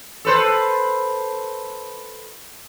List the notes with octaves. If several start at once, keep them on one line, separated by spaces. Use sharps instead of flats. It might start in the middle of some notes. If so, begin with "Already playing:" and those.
A4 B4 C5